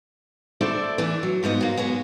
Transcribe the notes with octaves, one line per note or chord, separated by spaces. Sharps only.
A3 D4 E4 A4 C5 D5
E3 A3 D4
F#3
G#2 F3 B3 D#5
F#3 A#3
F#3 G#3 B3